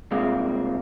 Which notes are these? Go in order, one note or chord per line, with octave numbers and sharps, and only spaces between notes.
C3 G3 G#3 A#3 F4